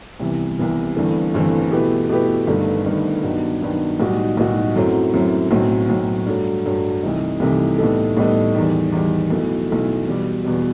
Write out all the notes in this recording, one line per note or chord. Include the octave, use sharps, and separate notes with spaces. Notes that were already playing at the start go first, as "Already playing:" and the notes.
C2 C3 E3 B3
C2 C3 E3 B3
G1 G2 E3 A3 C4
G1 G2 E3 A3 C4
B2 A3 E4 G4 B4
B2 A3 E4 G4 B4
G1 G2 D#3 A3
G1 G2 D#3 A3
G2 D#3 F#3 B3
G2 D#3 F#3 B3
B1 A2 G3 D#4 F#4
B1 A2 G3 D#4 F#4
F#2 F#3 A3 C4 E4
F#2 F#3 A3 C4 E4
B1 A2 F#3 C4
B1 A2 F#3 C4
G2 F#3 A3
G2 F#3 A3
C2 C3 E3 A3 D#4
C2 C3 E3 A3 D#4
A2 G3 B3 D#4 A4
A2 G3 B3 D#4 A4
E2 D#3 G3
E2 D#3 G3
B1 B2 A3 E4
B1 B2 A3 E4
E2 B2 G3
E2 B2 G3